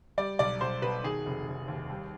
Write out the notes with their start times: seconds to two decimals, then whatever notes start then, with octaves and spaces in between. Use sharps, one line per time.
0.18 G3 D5
0.39 B1 D5
0.61 B1 C5
0.82 B2 B4
1.04 D#3 G#4
1.26 F1
1.48 F1
1.68 D#2
1.90 G3